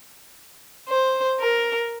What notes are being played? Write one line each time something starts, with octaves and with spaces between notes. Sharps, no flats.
C5
A#4